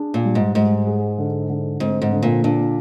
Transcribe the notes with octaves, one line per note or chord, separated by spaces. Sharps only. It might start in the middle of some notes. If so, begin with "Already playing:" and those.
Already playing: D4 G#4
A#2
G3
G#2
G#2 G3
G#4
D3
D3
G#2 C4
G#2
D3
A#2
A#2 D4